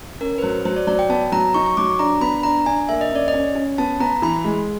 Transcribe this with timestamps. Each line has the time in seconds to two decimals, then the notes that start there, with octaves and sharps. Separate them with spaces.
0.21 C#4 A#4
0.38 B4
0.42 F#3 C5
0.65 F#3 C5
0.76 D5
0.87 F#3 D5
0.99 G5
1.09 B3 A5
1.32 F#3 A#5
1.54 D#4 C#6
1.66 C#6
1.77 F#3 D6
1.99 D4 A#5
2.21 B3 B5
2.43 D4 A#5
2.66 D4 G#5
2.89 A#3 E5
3.01 D#5
3.11 C#4 D5
3.28 D#5
3.33 C#4
3.55 C#4
3.78 B3 A5
4.00 B3 A#5
4.22 E3 B5
4.45 G#3